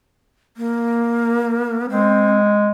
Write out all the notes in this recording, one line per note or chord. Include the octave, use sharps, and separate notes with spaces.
A#3
G#3 C4